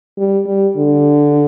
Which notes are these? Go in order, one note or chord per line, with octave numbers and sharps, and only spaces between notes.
G3
G3
D3